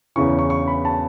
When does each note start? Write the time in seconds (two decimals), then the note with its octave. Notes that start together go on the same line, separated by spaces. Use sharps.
0.16 E2 C#3 E3 C#6
0.39 C#6
0.50 C#6
0.68 B5
0.85 A5